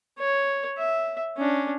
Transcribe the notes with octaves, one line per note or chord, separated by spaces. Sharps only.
C#5
E5
C#4 D4